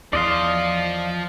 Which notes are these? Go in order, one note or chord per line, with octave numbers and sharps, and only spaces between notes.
E2 F3 D5 D#5 F5 C6